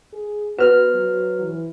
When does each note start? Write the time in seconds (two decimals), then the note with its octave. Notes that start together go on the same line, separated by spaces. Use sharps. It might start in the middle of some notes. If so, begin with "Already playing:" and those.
0.13 G#4
0.59 B3 F#4 B4 C5 F6
0.94 F#3
1.41 E3